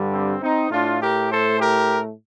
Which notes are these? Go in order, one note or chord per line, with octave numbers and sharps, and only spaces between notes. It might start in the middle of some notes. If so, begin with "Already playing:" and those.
Already playing: G2 D3 G3
C4
C4 D#4
A2 A3 D4 F4
G4 A#4
A4 C5
G4 A#4